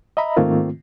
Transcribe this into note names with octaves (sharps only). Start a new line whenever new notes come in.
D#5 E5 A#5 B5
G#2 D#3 A3 A#3 C4 F4